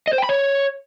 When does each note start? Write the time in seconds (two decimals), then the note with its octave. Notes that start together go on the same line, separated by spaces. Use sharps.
0.07 D#5
0.13 C5
0.18 G5
0.24 B5
0.29 C#5